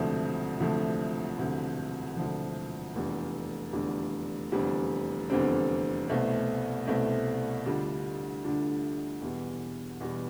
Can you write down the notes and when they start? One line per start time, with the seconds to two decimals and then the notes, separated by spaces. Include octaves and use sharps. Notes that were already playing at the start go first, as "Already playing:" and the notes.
Already playing: E1 D2 C3 F3 A3
0.60 E1 D2 C3 F3 A3
1.38 E1 D2 C3 F3
2.16 E1 D2 C3 F3
2.96 F1 E2 D3 G3
3.73 F1 E2 D3 G3
4.52 F1 E2 D3 G3 C4
5.30 F1 E2 D3 G3 C4
6.08 C2 B2 A3 C4
6.87 C2 B2 A3 C4
7.65 D2 D3 G3 D4 F4
8.43 D2 D3 G3 D4 F4
9.22 E2 B2 G3
10.00 E2 B2 G3